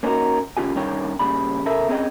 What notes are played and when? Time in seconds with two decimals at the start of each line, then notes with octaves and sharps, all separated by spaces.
0.03 A#3 C#4 D#4 F4 F#4 A#4
0.57 D3 C#4 F4 G4 G#5
0.75 C2 G2 D#3 C#4 C#5 G5
1.19 A#2 C#3 G3 B5
1.65 C#3 A4 A#4 E5
1.89 C4 C#4 G#4 A#4 D#5 G5